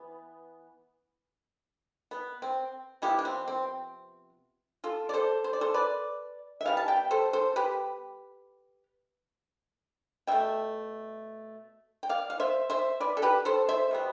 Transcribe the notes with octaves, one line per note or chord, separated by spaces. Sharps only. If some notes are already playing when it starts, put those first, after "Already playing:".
Already playing: E3 B3
B3
C4
C3 F3 B3 E4 G4
D4
C4
C4
F4 A4
D5
A4 C5
C5
D5
A4 C5
B4 D5
E5
E3 G3 B3 F5
A5
E5 G5
A4 C5
A4 C5
G4 B4
B2 A3 E5 G5
G5
D5 F5
F5
C5 E5
C5 E5
B4 D5
A4
G4 B4
A4 C5
C5 E5
B2 G3 B3